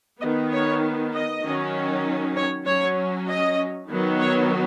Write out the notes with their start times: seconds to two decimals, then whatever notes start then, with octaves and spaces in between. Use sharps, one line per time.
0.21 D#3 B3 D#5
0.52 C#5
1.13 D#5
1.44 D#3 F#3 C#4
2.36 C#5
2.66 F#3 C#4 C#5
3.28 D#5
3.88 D#3 F#3 B3
4.20 C#5